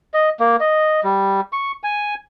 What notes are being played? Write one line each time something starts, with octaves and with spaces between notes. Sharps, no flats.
D#5
A#3
D#5
G3
C#6
G#5